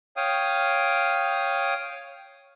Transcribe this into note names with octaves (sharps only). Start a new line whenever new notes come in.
C#5 F5 G5 D#6